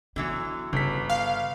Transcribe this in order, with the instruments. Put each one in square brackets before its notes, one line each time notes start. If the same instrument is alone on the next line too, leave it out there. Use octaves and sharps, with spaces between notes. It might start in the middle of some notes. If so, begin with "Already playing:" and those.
[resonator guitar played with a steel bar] D3 E3 F#3 [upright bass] B3
[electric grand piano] G1 B6 [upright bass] C#3
[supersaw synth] F5